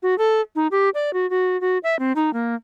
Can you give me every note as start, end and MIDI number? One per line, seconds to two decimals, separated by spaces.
0.03 0.17 66
0.18 0.41 69
0.55 0.67 63
0.71 0.89 67
0.94 1.13 74
1.13 1.29 66
1.30 1.59 66
1.61 1.78 66
1.83 1.98 76
1.99 2.12 60
2.16 2.33 63
2.33 2.55 58